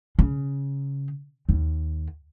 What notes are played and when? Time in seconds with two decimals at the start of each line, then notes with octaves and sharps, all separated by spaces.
0.19 C#3
1.49 D#2